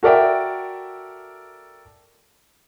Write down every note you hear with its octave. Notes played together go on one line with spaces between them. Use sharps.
F#4 A4 A#4 D5 E5 G5